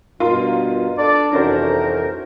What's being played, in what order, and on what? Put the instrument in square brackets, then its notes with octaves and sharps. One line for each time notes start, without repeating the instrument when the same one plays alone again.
[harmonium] G2 B2 [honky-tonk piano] F4 A#4 C6
[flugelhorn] D4 [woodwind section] A4 D5
[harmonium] F2 C3 E3 [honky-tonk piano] C#4 F#4 C5 [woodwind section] D#4 A#4